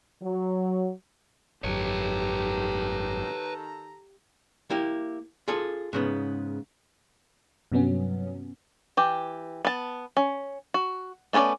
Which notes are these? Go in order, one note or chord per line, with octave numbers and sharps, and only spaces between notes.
F#3
G#1 F#2 D#3 G4 A4 B4 C#5 A#5
A#3 E4 G4
F4 G#4 A4
G#2 C#3 B3
G2 C3 F#3 B3 C#4
E3 G4
B3 A5
C#4
F#4
A3 B3 C#4 C#5 D5